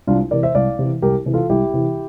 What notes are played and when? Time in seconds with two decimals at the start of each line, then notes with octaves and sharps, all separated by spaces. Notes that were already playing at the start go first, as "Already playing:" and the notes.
0.07 C2 D4 F4
0.31 C3 E3 A#4 D5
0.43 C5 E5
0.55 C2 D5 F5
0.79 C3 E3
1.02 C2 G4 A#4
1.26 C3 E3
1.33 F4 A4
1.50 C2 E4 G4
1.73 C3 E3